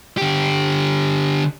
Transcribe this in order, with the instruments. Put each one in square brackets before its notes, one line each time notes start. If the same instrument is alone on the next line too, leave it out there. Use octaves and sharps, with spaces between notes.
[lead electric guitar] D3 G4